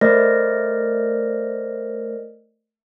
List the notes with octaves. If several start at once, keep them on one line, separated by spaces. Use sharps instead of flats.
A3 A#4 C5 D5 D#5 A#6